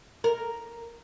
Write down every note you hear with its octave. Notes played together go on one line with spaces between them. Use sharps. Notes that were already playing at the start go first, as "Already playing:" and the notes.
A#4